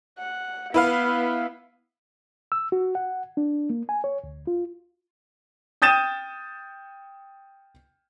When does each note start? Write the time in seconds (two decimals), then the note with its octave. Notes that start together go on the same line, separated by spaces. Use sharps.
0.19 F#5
0.74 B3 E4 B4 F5
2.52 E6
2.72 F#4
2.95 F#5
3.37 D4
3.70 A#3
3.89 G#5
4.04 C#5
4.24 D2
4.47 F4
5.82 G5 D#6 G6 A6 D#7 E7